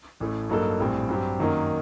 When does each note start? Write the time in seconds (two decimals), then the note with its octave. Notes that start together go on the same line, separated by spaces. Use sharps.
0.20 A1 A2 A3
0.49 G2 F#3 A#3 D#4 A4
0.80 A#1 A2 G3 C4
1.09 G2 F#3 C4 G4
1.39 F#2 D#3 F#3 A#3 D#4